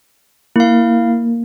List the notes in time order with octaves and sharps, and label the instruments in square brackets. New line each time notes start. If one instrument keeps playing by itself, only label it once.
[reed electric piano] A#3 [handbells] E4 F5